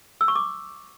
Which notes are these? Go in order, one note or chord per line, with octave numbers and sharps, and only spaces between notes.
E6
C#6
D6